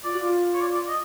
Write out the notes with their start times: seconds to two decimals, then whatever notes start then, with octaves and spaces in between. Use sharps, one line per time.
0.04 F4 D5
0.13 F#4
0.20 F4
0.54 C#5
0.60 D5
0.75 D5
0.89 D#5